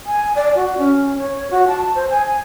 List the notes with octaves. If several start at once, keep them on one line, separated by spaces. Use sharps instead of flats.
G#5
D5
F#4
C#4
C#5
F#4
A5
C5
G#5